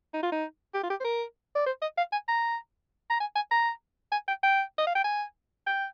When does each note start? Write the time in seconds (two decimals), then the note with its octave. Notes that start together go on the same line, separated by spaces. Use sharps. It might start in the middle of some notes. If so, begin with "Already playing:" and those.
0.13 D#4
0.23 F4
0.32 D#4
0.74 G4
0.83 F4
0.90 G4
1.00 C5
1.04 A#4
1.55 D5
1.66 C5
1.82 D#5
1.97 F5
2.12 G#5
2.28 A#5
3.10 A#5
3.20 G#5
3.36 G#5
3.51 A#5
4.12 G#5
4.28 G5
4.43 G5
4.78 D#5
4.87 F5
4.95 G5
5.04 G#5
5.67 G5